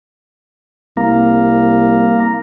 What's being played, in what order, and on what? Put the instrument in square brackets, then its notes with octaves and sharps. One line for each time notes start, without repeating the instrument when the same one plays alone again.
[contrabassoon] C2 [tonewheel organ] A#3